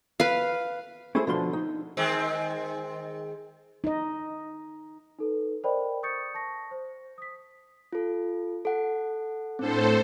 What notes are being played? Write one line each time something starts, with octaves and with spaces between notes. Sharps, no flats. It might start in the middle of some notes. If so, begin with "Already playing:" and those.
B4 F5
C#4 E4 G#4 A4 C5
B2 D3 F3 D4 C6
D#4
D#3 G#3 C4
D#4 D#5
D#4 A4 B4
A#4 C5 D5 D#5 G5 B5
C#6 D#6 G6 A6 C#7
A5 C#6 A#6
C5
D#6 B6
F4 A4
A4 F#5
A2 C4 D4 A4 C5